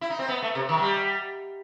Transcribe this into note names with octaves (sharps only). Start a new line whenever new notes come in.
E4
D#4
C4
B3
A3
C3
D#3
F#3
G3